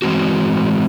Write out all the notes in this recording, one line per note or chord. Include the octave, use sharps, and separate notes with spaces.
E3 G#3 C4 F#4